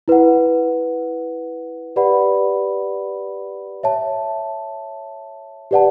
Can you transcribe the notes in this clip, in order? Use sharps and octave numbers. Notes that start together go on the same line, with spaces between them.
E4 B4 F#5
G4 B4 D5 F#5 B5
C#5 E5 A5
G4 B4 D5 F#5 A5